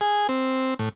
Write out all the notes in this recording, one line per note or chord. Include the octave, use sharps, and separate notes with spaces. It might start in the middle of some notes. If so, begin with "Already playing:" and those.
G#4
C4
A2